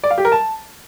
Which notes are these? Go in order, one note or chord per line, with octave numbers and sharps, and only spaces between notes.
D5
F5
G4
A#4
A5